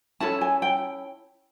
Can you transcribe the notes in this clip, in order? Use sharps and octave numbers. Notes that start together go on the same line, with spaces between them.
C#4 E4 A4 A5
G#5
G5